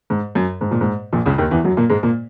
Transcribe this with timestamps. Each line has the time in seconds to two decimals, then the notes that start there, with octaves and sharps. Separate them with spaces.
0.10 G#2
0.35 F#2
0.61 G#2
0.71 A#2
0.81 G#2
1.13 A#1 A#2
1.26 C#2 C#3
1.38 D#2 D#3
1.51 E2 E3
1.64 F#2 F#3
1.77 A#2 A#3
1.89 G#2 G#3
2.03 A#2 A#3